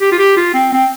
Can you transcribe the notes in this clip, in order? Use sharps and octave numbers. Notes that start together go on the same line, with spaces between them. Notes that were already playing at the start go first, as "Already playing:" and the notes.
G4
F4
G4
F4
C4
C4